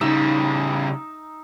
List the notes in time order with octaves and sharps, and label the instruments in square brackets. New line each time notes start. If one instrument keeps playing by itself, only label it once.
[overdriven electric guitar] C#3 G3 [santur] D#4 E6